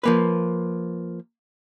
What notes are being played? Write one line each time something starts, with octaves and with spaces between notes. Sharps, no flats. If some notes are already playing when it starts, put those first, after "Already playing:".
F3 A#3 B4